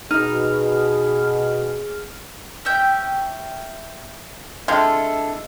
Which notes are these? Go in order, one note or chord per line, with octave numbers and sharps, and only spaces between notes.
B2 D#4 G#4 F6
C#4 E5 G5
C3 G#3 D4 E4 F4 A4